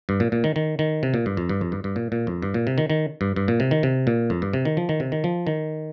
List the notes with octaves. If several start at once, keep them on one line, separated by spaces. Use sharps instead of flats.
G2
A#2
A#2
D#3
D#3
D#3
C3
A#2
G2
F2
G2
F2
G2
G2
A#2
A#2
F2
G2
A#2
C3
D#3
D#3
G2
G2
A#2
C3
D#3
C3
A#2
F2
G2
C3
D#3
F3
D#3
C3
D#3
F3
D#3